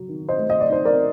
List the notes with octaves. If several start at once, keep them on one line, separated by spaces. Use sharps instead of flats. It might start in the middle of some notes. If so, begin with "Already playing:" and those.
Already playing: F#3
D#3
C5 D#5
A3
D#5
D5
D#4 C5
A#4 D5